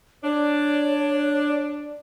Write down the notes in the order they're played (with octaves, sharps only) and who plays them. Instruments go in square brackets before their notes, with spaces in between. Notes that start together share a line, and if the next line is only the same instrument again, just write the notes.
[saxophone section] D4 [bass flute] C#5